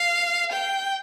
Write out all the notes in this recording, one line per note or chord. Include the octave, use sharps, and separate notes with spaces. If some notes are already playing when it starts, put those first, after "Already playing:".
Already playing: F5
G5